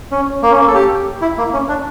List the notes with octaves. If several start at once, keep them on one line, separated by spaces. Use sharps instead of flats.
C#4
A#3
C#4
A#3
A4
G4
E4
A#3
C#4
D4